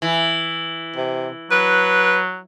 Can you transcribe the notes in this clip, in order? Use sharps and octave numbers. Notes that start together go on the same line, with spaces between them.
E3
C3
F#3 B4